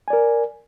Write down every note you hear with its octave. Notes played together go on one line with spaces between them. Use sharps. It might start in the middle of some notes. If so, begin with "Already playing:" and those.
A#4 D5 G#5